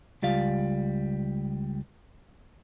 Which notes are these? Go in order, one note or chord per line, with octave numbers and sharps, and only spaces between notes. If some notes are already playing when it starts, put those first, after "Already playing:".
C#2 G3 F4 F5